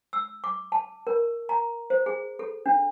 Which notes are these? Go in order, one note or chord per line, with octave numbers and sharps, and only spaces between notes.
E6
D6
A5
A#4
A#5
C5
G#4
A4
D4